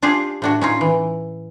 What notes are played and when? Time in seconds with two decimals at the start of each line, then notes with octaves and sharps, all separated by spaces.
0.02 D4 F4 G4 G#4 F5
0.42 A2 D4 F#4
0.61 C#4 D#4 F4
0.81 E3